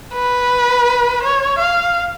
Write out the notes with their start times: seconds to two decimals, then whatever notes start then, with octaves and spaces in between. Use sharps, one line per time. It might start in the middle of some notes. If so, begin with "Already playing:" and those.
0.14 B4
1.23 C#5
1.59 F5